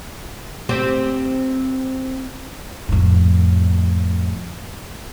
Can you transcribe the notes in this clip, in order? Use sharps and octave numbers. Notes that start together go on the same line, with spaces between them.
C4 G4 C5
F2 A2